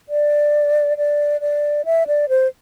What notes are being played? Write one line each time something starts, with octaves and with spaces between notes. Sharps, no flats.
D5
D5
D5
E5
D5
C5